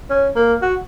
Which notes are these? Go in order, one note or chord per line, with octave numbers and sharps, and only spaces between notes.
C#4
A#3
F#4